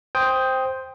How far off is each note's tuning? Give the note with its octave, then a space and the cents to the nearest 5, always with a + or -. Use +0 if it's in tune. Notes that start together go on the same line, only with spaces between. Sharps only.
C5 +0 G5 +5 D#6 +15